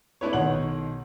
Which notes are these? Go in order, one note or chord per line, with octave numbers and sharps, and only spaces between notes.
A3 D4 E4 B4 C#5
B1 D#3 C#5 F#5 F#7